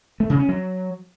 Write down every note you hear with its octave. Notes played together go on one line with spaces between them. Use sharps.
A3
C#3
C#4
F#3